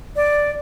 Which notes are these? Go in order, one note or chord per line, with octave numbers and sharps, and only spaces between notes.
D5